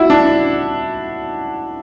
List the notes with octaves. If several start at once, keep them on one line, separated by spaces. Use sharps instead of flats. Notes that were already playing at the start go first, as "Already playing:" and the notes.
Already playing: E4 F#4
D4